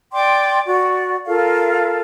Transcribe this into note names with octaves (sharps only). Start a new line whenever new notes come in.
D5 G5 C6 D6
F#4 D5
F4 A4 A#4 F5